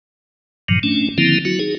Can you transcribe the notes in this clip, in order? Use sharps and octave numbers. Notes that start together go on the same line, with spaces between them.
G2 A#2 D#3 F3 F#3
A3 C#4 D4
D3 D#3 F3 A#3 C4 E4
F#3 E4 F#4
D#4 G#4